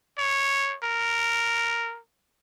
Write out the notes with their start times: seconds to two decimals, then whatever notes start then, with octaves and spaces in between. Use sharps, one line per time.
0.18 C#5
0.83 A#4